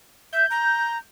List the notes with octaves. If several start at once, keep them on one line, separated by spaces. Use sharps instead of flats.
E5 G6
A#5